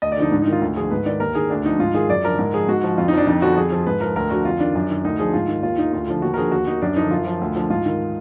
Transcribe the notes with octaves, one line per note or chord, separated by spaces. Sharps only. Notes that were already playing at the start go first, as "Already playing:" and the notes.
D2 D#5
D5
D3 F3 D#4
G#2 D4
D#4
D#3
F4
D2
D3 F3 G#4
G#2 B4
D#3 D5
D#2 A#4
D#3 G#4
D2 D4
D3 F3 D#4
G#2 F4
D#3 G#4
F#2 D5
D3 F3 A#4
G#2 A#4
F3 G#4
G#2 F#4
F3
F2 F4
D#4
F3 D4
F2 D#4
D3 F3 F#4
F2 G#4
F3
G#2 B4
F3 A#4
D2 A#4
D3 F3 F#4
F2 F4
D#3 D4
F#2
D#3
D2 D#4
D3 F3 G#4
G#2 F4
D#3
D#2 F4
D#3 D#4
D2 F4
D3 F3
D#2 F#4
A#4
D3 F3 G#4
D#2 F#4
D#3 D#4
F#2 D4
D3 F3 D#4
F#2 F4
F3
D2
D3 F3
G#2 F4
D#3